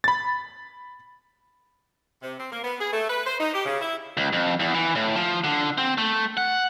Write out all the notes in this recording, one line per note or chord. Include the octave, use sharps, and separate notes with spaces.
B5 A6
C3
C4
A#3
B3
G#4
A3
B4
C5
D#4
G4
C#3
E4
C#2
F2
E2
E3
A2
F3
D3
C4
A3
F#5